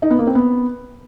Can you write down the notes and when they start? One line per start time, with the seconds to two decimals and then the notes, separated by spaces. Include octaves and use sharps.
0.02 D#4
0.10 B3
0.19 A#3
0.27 C4
0.35 B3